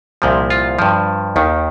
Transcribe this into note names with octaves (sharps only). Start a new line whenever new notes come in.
C2 A#2 F3
F4
G2 F3
D#2 D#3